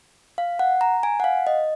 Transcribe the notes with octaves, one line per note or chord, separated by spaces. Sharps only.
F5
F#5
A#5
G#5
F#5
F5
D#5